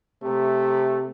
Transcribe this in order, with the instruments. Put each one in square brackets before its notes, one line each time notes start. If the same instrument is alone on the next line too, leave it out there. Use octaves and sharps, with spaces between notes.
[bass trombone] C3 [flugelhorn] A3